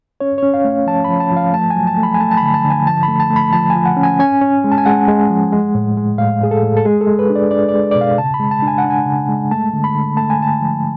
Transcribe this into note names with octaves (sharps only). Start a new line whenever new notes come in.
C#4 C#5
C#4 C#5
F5
A3
F3 A5
F3 B5
A5
F3 F5
A3 A5
G#5
F#3
A5
A3
B5
G#5
A3 A5
A5
B5
D3
A5
D3
G#5
F3 A5
B5
A3
A5
A3
B5
F3 A5
G#5
F3
F#5
C#4
G#5
C#4 G#5
C#4
G#3
A5
G#5
G#3 F#5
G#3
F3
G#3
A2
G#3
A2 F5
A2 G#4
A4
A2
A4
G#3 G#4
A4
G#3
B4
D4
D5
D4 D5
D5
G#3
B2 D5
F5
C#3 A5
B5
G#3
A5
D4
G#5
F#5
D4
G#5
C#3
G#3
A3 A5
D3
B5
D3
A3 A5
G#5
D3 A5
F3